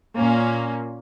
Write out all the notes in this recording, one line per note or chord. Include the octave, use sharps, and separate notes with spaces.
A#2 A#3 C#4